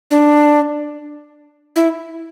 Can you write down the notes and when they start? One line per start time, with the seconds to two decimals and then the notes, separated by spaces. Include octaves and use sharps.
0.11 D4
1.76 E4